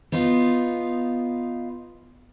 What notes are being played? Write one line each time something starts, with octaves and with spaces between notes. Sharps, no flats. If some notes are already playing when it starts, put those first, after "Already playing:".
B3 D#4 F4